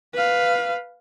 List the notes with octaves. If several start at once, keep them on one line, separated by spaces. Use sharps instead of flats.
B4 F5